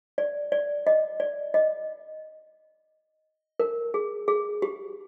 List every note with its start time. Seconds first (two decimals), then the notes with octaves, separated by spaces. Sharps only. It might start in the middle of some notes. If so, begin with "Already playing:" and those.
0.18 D5
0.52 D5
0.87 D#5
1.20 D5
1.54 D#5
3.60 A#4
3.94 G#4
4.28 G#4
4.62 G4